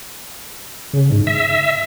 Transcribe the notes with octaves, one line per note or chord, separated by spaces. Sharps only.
C#3
G#2
E5